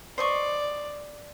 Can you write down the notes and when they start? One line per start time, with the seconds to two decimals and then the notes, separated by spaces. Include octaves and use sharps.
0.18 C5 D5 D#5 C#6